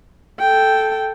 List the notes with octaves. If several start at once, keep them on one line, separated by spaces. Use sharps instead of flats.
A4 G5